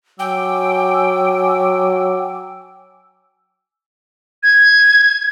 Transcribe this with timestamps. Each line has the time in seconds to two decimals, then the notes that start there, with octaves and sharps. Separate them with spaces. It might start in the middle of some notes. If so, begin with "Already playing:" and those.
0.19 F#3 G5 G#5 D6 E6
4.43 G#6